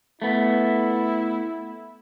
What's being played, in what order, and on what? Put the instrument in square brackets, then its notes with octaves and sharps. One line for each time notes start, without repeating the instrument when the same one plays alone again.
[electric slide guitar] A3 B3 [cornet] E4